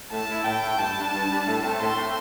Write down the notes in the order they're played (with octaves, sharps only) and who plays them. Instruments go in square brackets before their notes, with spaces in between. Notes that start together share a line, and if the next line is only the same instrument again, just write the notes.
[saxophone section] A2 [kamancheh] A5
[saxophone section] A3 E4
[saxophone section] A2 [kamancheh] G5
[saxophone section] A3 E4
[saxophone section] G2 [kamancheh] A5
[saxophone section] G3 D4
G2
G3 D4
A2
A3 C4
[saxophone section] A2 [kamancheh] C6
[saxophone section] A3 C4